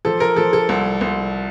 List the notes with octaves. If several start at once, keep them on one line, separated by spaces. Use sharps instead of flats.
F3 A4
A#4
F3 A4
A4
C2
C2